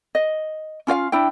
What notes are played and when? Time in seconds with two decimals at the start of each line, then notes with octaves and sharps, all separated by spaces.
0.15 D#5
0.87 C#4 F4 D5 F5
1.12 D4 E4 G5